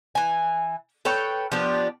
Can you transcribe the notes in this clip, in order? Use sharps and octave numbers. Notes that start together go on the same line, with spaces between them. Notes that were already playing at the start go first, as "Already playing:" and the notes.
E3 G#5
A4 B4 C#5 G5
F3 B3 D4 G4